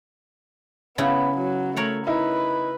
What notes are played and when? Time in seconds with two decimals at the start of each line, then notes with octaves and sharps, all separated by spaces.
0.98 C#3 B3 E4
1.37 F#3
1.76 A3 A#4 C#5 F#5
2.07 D#4 E4 B4